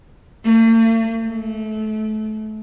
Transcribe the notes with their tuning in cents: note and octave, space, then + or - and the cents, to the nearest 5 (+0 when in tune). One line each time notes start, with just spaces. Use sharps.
A3 +45
A3 -25